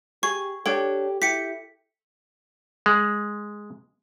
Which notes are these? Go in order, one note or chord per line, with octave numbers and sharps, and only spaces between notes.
G4 G#4 C#6
D4 G4 A4 C#5 G5
E4 G4 B6 C#7
G#3